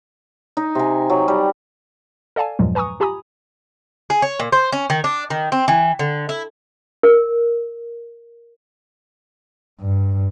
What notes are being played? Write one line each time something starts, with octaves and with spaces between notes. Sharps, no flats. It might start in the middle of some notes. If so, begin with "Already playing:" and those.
D#4
C3 G#5
F#3
G3
A4 D5 F5 G#5 A5
E2 G2 A#2 F3 F#3 G#3
B4 G#5 A#5 C#6 D#6
F4 G4 G#5 A#5 B5 D#6
G#4
C#5
A#2
C5
C#4
D#3
D4
D#3
C4
E3
D3
E4
A#4
G2